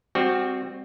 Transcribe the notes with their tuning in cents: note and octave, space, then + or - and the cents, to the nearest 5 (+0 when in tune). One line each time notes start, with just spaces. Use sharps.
G3 +30 C4 +0 F#4 +0